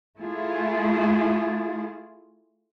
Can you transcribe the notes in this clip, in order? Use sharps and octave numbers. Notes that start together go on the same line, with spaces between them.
A3 E4 F4 G#4